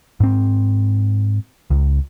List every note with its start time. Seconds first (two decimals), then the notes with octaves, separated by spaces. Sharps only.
0.20 G#2 C4
1.70 C#2